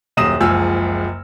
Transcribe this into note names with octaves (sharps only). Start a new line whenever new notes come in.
D#1 F#2 D#6 A#6 E7
F#1 C#2 F3 G#5 E6 F6